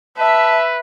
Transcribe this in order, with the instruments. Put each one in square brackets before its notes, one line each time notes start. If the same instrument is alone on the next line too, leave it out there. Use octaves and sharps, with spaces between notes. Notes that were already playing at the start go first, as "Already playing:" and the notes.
[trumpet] B4 [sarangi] E5 [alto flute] A5